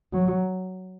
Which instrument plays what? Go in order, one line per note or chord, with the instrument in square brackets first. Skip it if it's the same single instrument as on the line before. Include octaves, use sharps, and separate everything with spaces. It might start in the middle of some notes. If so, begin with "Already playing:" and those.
[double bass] F#3